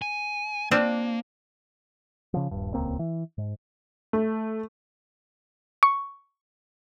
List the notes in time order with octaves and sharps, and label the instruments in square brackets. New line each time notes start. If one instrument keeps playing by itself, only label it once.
[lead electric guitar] G#5
[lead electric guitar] A#3 [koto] C4 D4 F4
[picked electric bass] C#3 F3
D#1 G2
D#1 C#2 A#3 C4
E3
G#2
[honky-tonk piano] A3
[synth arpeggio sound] C#6